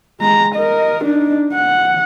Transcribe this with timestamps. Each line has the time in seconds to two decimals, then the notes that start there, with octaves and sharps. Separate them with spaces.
0.20 G#3 A#5
0.55 A#4 D#5
1.04 D4 D#4
1.54 F#5